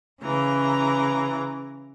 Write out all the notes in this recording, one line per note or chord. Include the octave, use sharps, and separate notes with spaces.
C#3 E3 A#5 D6